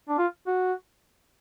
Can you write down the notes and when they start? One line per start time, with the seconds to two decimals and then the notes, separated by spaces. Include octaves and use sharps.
0.08 D4
0.18 F4
0.47 F#4